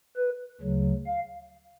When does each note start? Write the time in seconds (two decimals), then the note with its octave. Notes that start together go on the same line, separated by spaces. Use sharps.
0.16 B4
0.61 D2 C#3 F#3
1.06 F5